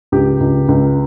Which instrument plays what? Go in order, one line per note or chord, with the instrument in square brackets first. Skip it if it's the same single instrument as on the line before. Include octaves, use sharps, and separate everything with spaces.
[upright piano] C#2 G4
C#2
C#2